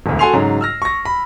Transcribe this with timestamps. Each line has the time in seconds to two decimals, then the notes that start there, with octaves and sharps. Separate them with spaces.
0.06 E1 D2
0.19 F#4 A4 G#5 C6 C7 F7
0.33 G#2 C#3 F#3
0.61 E6 F6 A#6
0.82 C#6 A#6
1.05 B5